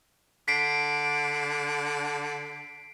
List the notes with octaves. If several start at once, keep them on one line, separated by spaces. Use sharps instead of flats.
D3 B6 C7 D7